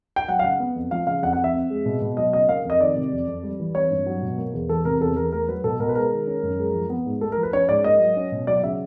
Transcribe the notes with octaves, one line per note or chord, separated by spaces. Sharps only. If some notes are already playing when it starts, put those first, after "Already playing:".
G5
F#3 F#5
F5
C#3 F#5
B3
F2
F3 F5
C#3 F5
F2 F#5
F#5
F2
E5
C4
G#3
B2
B2
F#3 D#5
C#3 D#5
A#3 F5
F2 D#5
D#3 D5
C3
F2
F2
G3
E3
C4 C#5
G2
F#3
B2
A#3
E2
E3 A4
C3 A#4
E2 A4
E2 A#4
A3 A#4
F#3 B4
B2 A4
B2 A#4
B4
G#3 A#4
D#3
C#4
F#2
G#3
F3
B3
G#2
A3 A4
A#4
F3
B4
C#4 C#5
G#2 D5
A#3 D#5
F#3
C#4
B2
F#3 D5
C#3 E5